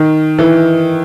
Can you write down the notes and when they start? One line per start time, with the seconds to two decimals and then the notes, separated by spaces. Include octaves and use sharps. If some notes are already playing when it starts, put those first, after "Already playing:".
Already playing: D#3
0.39 E3